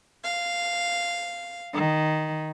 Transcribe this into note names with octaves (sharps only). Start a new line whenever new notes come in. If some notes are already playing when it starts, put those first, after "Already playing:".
F5
D#3